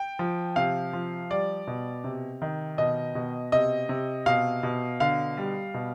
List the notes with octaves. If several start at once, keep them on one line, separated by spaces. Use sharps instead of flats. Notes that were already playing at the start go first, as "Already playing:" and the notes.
Already playing: G5
F3
C3 F5
F3
G3 D5
B2
C3
D#3
B2 D#5
B2
C3 D#5
C3
B2 F5
B2
D3 F5
G3
B2